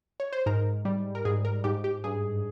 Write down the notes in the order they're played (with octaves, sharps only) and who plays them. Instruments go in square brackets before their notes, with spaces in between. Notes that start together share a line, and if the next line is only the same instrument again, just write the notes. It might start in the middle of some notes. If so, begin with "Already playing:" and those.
[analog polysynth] C#5
C5
G#2 A#4
G3
A#4
G#2 G#4
A#4
G#2 G4
G4
G2 G#4